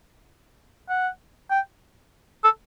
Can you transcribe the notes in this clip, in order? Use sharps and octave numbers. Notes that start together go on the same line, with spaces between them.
F#5
G5
A4